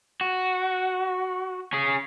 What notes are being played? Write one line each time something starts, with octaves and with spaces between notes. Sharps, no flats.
F#4
C#4 G#4